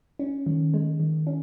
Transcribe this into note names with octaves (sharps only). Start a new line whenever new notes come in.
C#4
D#3
G#3
D#3
C#4